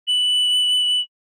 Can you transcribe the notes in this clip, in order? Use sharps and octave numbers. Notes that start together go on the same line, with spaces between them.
F#7